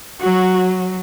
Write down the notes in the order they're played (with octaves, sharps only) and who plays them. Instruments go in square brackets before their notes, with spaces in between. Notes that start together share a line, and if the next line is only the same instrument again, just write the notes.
[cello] F#3 [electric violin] F#4